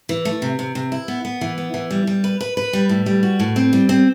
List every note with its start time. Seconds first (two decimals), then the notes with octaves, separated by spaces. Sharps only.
0.09 E3
0.25 A3
0.42 C3
0.59 C3
0.75 C3
0.92 E4
1.08 B3
1.25 B3
1.41 E3
1.58 B3
1.74 E3
1.91 G3
2.07 G3
2.24 B4
2.41 B4
2.57 B4
2.73 G3
2.89 A2
3.06 G3
3.23 F#4
3.40 A2
3.56 C4
3.73 G3
3.89 C4